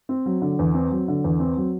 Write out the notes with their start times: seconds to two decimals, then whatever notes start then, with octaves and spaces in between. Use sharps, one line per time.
0.09 C4
0.26 F#3
0.42 D3
0.59 E2
0.74 C4
0.91 F#3
1.08 D3
1.24 E2
1.40 C4
1.57 F#3